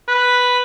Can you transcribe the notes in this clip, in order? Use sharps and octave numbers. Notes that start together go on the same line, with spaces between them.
B4